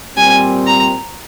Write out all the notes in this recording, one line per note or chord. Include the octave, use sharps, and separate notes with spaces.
A#2 G3 C4 G#5
A#5